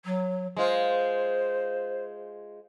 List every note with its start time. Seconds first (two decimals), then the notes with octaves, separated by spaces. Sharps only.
0.04 F#3
0.57 G#3 F4 C5